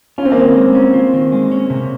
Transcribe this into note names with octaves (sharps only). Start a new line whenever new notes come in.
C#4 F4
C4
A#3
D#3 C4
G#3
C#4
F4
D#3
G#3
C#4
C3